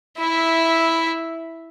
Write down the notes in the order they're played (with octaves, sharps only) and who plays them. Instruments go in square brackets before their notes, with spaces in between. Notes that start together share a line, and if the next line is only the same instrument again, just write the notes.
[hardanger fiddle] E4 E5